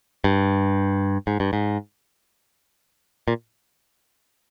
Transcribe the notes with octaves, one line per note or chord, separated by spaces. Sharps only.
G2
G#2
G2
G#2
A#2